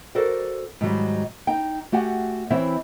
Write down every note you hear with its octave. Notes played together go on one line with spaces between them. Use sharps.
F#4 A4 A#4 C5 D5
G#2 D#3 F#3 G3
D#4 G5
A3 F#4 G4 F#5 G#5
E3 C4 E4 C5 C#5 E5